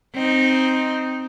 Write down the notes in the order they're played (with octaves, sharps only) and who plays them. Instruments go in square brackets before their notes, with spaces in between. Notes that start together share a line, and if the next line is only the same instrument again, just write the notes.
[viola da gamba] C4 D#4